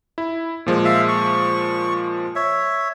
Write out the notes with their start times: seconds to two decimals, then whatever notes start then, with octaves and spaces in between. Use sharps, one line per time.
0.18 E4
0.66 A#2 F3 G#3
0.85 E5 F5
1.08 C#6
2.36 C#5 E5